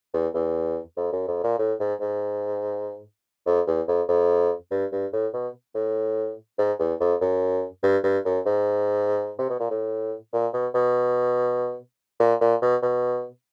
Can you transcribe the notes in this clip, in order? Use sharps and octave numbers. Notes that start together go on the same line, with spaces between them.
E2
E2
F2
F#2
F2
A#2
A2
G#2
G#2
F2
E2
F2
F2
G2
G2
A2
B2
A2
G#2
E2
F2
F#2
G2
G2
F#2
G#2
C3
B2
A#2
A2
A#2
B2
B2
A#2
A#2
B2
B2